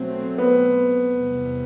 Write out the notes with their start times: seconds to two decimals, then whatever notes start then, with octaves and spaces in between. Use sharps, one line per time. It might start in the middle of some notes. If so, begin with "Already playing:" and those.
Already playing: B2 F#3 A3 C4
0.38 B3
1.12 E2 C3 G3